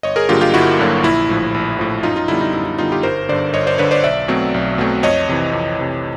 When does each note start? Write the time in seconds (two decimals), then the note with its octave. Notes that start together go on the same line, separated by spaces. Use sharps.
0.03 G1 C#5 D#5
0.16 G#4 A#4
0.29 G2 D3 F#3 A#3 F4 G4
0.41 F4 G4
0.54 G1 E4 F#4
0.79 G2 D3 F#3 A#3
1.03 A#1 E4
1.29 A2 F3
1.54 A#1
1.79 A2 F3
2.03 F#2 D#4 F4
2.16 D#4 F4
2.28 D3 G3 B3 E4
2.41 D#4
2.53 F#2 E4
2.66 E4
2.78 D3 G3 B3 D#4 F4
2.92 F4 G4
3.03 G1 A#4 C5
3.29 G2 D3 C5 D5
3.54 G1 C#5 D#5
3.67 C5 D5
3.78 G2 D3 B4 C#5
3.91 C5 D5
4.04 B1 D5 E5
4.28 B2 F#3 A3 C4
4.54 B1
4.78 B2 F#3 A3 C4
5.03 F2 C#5 D#5
5.29 C3 E3
5.53 F2
5.78 C3 E3